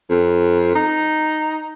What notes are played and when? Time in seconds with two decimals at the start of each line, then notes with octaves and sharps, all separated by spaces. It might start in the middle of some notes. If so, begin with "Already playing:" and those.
0.10 F2
0.75 D#4